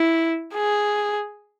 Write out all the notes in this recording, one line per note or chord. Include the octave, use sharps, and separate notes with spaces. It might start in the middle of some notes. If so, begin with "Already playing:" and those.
Already playing: E4
G#4